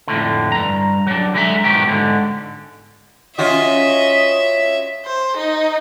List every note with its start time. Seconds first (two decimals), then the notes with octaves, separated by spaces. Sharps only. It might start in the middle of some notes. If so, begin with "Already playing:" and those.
0.08 F2 A2 D3
0.52 G2 A#5
1.07 F#3 D4
1.34 D3 F#3 G#3 D5 E5 A#5
1.64 G#2 B2 D#3 F#3 G4
1.88 G#2 D3
3.38 C#4 F4 F#4 D#5 E5
5.05 C5
5.37 D#4